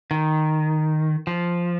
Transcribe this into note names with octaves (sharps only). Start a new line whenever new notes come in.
D#3
F3